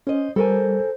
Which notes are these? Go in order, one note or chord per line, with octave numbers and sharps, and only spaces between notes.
C#4 C5 D#5
G3 A4 A#4 C5 G#5